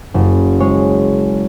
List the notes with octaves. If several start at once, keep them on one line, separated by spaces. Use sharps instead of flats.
F#1
G#3 C#5